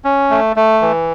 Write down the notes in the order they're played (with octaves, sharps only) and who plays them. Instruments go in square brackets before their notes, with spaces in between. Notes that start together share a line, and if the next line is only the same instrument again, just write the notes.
[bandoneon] C#4
A3
A3
E3